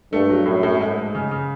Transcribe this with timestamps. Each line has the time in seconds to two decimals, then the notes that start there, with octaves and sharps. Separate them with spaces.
0.12 G2 A3
0.30 F#3
0.46 F#2 A2
0.63 A2
0.81 G#2
0.98 G#2
1.15 C#3
1.31 C#3